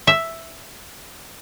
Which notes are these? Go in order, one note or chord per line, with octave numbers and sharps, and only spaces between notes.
E5